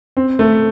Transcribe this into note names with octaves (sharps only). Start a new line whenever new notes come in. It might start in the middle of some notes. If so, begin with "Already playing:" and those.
C4
A3